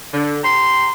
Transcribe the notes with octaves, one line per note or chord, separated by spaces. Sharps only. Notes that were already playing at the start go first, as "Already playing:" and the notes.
D3
G4 A#5 C6